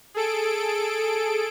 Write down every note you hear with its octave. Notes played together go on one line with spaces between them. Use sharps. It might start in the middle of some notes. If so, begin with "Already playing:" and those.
G#4 A4 D7